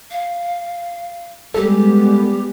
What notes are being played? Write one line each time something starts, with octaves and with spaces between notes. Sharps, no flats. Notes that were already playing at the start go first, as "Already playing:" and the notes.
F5
G3 G#3 B3 G4 A4